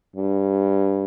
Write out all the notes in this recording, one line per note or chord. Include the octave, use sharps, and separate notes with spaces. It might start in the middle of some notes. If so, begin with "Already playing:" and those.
G2